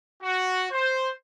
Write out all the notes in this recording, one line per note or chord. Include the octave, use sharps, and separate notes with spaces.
F#4
C5